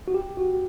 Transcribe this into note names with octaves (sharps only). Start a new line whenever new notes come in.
F#4
G4
F#4